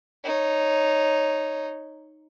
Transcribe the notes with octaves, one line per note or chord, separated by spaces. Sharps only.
D#4 C#5